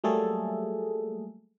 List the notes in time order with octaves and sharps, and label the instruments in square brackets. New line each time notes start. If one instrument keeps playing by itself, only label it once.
[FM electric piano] F#3 G3 A3 A#3 G#4 A4